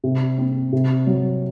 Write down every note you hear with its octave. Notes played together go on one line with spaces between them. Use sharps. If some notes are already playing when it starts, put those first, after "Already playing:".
C3
C4
C3
F#3